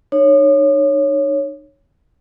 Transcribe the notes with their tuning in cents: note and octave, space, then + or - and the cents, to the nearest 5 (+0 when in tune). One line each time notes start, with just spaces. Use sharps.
D#4 -40 C#5 +0